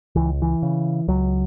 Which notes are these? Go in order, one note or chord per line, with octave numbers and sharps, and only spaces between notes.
C#2 E3
E3
C#3
C#2 F#3